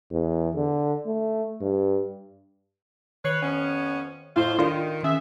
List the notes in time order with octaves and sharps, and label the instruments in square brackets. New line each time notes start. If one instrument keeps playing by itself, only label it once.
[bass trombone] E2
D3
A3
G2
[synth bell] D#3 C7 F#7 [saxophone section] B4 C#5
[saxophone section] F2 B3 C#4
[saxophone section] F2 F4 C5 [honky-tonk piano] A2
[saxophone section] D#3 [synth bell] D4 A4 D5 [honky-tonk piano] F4
[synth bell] D#3 C#4 [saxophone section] G#4 E5